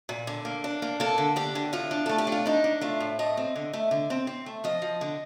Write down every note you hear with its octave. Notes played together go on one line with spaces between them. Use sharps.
A#2
D3
A#3
D4
A#3
A#3 A4
D3
D4 G4
D3
A2 F4
D4
A3 A4
G4
D4
F4
D4 D#4
D4
A3 F4
A2
A3 D#5
C4
D3
A3
D3
C4
C4
A3
F3 D#5
F3
D3